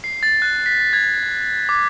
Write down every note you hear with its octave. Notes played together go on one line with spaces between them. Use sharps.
C7
A6
F#6
B6
G#6
D6